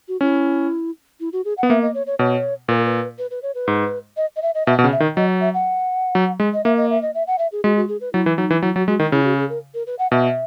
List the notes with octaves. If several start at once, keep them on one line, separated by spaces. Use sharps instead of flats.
F#4
C#4 E4
E4
F#4
G#4
F#5
B3
A#3 E5
D#5
C#5
C#5
B2 C#5
A#2 B4
A#4
B4
B4
B4
C#5
B4
G#2
D#5
D#5
E5
D#5
B2 E5
B2 F#5
C#3
E5
D#3
F#3 D#5
E5
F#5
F#3
G#3
D#5
A#3 E5
D#5
E5
D#5
E5
F#5
E5
G#4
G#3 F#4
F#4
G#4
B4
F#3 E4
E3
F#3 D#4
E3
F#3 E4
F#3 F#4
G#3 F#4
D#3 D#4
C#3 E4
F#4
G#4
A#4
A#4
B4
F#5
B2 E5